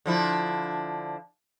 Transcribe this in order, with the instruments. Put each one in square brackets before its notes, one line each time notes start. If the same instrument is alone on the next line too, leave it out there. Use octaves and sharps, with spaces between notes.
[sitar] D3 F3 E4